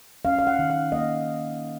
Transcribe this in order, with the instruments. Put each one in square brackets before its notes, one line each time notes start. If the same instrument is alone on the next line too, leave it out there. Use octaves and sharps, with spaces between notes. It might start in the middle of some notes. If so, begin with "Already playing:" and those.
[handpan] C#4 F5
F5
F#5
D#3
F5
A#3 D#5